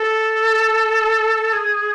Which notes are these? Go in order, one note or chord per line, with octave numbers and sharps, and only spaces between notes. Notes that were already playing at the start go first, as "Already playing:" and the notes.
Already playing: A4
G#4